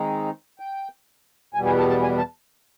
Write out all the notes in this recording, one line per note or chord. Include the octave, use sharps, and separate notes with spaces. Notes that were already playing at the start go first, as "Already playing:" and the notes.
Already playing: D#3 G#3 C4 D#4
G5
E2 B2 G3 B3 G#5
G#5
A5
A5
G#5
A5